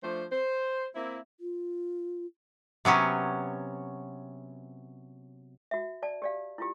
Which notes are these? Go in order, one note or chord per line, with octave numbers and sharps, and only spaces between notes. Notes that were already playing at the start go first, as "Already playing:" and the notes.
F3 A3 D4 C5
C5
A#3 C4 E4
F4
C3 F#3 B3 C#4
F#4 E5
D5 A5
G4 D5 F5
E4 F4 G4